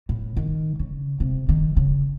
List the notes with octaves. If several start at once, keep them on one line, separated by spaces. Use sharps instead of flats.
A2
D#3
C#3
C3
D#3
C#3